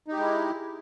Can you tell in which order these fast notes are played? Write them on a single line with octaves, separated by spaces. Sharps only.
D#4 G4 G#3 E4